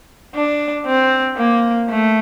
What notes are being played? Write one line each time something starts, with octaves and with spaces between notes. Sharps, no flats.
D4
C4
A#3
A3